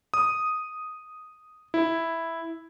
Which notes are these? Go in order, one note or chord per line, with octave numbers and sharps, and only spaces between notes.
D#6
E4